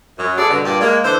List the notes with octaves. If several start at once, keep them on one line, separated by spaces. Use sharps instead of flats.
F#2
B3 G#4 A4 D5
G2 B2 D3
G2 A#2 G3 G4 D5
G#3 A#3
D3 E3 C5